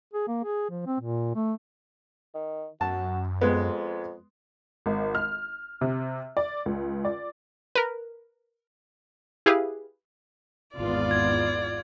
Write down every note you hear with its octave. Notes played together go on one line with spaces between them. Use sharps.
G#4
A#3
G#4
F3
C4
A#2
A3
D#3
F#2 F#4 A5
F2 G#3 B3
G#1
F6
C3
D5
C#2
D5
A#4 B4
E4 G4 G#4 B4 F5
G#1 E2 B3 F4 D5
G#6